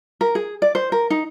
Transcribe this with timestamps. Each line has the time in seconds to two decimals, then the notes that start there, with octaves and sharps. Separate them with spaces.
0.21 A#4
0.35 G#4
0.62 D5
0.75 C5
0.92 A#4
1.10 D#4